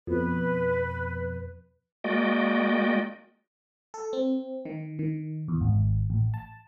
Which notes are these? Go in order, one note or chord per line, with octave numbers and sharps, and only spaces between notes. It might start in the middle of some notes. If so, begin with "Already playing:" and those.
F2 B2 B4
G#3 A#3 F#4 D5 D#5 G5
A4
C4
D#3
D#3
E2
G#1
A1
A5